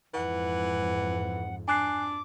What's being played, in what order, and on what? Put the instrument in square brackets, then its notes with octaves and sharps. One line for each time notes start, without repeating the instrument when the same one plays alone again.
[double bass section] F2 G#2 [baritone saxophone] E3 [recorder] F#5
[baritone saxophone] D4 [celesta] G#5 F#6 C7 [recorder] D6